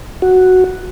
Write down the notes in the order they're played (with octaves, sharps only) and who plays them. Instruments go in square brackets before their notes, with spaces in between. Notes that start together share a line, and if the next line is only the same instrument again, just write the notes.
[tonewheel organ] F#4